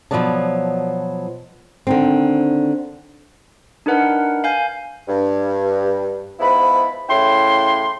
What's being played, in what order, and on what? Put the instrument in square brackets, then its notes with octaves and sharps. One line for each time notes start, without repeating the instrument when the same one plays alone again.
[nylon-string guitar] B2 F3 F#3 B3 D5 A5
D3 D#3 C4
[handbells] D4 D#4 A#4 B4 F#5
F5 G#5 G6
[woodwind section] G2
G#2 F3 B3 E4 B5
A2 C#3 E4 G5 C6